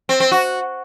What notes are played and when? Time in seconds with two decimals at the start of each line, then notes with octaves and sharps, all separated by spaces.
0.09 C4
0.20 C4
0.31 F#4